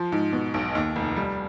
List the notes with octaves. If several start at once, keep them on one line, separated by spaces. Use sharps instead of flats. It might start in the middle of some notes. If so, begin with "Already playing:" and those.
Already playing: F3
G#2
B2
B1
D#2
F1
G3